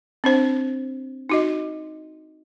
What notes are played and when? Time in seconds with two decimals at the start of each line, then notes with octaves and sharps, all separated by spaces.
0.24 C4 D4 C5
1.29 D#4 F#4 D#5